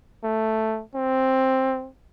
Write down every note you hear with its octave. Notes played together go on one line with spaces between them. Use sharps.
A3
C4